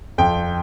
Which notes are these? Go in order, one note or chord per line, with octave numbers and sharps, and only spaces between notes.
F2 G5